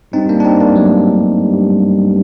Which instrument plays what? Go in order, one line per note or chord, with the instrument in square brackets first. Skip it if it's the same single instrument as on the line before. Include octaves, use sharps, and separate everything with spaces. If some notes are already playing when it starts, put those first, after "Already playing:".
[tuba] G2 [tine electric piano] C4 D#4
[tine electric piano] A#3 D4
D4
C4 D#4
A#3 D4
F#3 A3
[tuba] G2